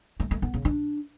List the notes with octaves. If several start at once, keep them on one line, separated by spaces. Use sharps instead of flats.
A3
A3
B3
C#3
D4